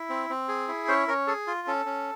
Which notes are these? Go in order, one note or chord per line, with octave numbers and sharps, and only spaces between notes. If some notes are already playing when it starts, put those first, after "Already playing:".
Already playing: E4
C4
C4
G#4
E4
C#4 C5
C#4 A#4
G#4 A4
F4
C#4 A4
C#4